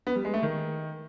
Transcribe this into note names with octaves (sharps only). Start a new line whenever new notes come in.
B3
G3
G#3
A3
D#3